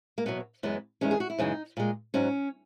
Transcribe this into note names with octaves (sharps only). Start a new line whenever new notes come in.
A#3
E2 B2 F#3 B3
F#2 E3 G#3 B3
E2 D#3 G#3 C#4
G#4
F#4
E4
F#2 C#3 E3 G#3 D#4
A#2 G#3
G#2 F#3 C#4